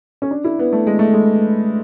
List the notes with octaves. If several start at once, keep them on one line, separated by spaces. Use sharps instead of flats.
C#4
D4
E4
B3
A3
G#3
A3
G#3